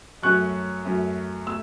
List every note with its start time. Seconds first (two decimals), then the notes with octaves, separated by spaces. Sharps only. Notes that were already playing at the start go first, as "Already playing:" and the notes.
0.23 F#2 F#3 A3 C#4 C#6 F#6
0.85 F#2 F#3 A3 C#4
1.47 B2 A3 E6